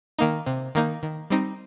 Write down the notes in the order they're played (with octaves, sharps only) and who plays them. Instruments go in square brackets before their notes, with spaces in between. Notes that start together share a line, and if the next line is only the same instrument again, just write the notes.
[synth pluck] D#3 A#3 D#4
C3
D#3 A#3 D#4
D#3
G3 C4 D#4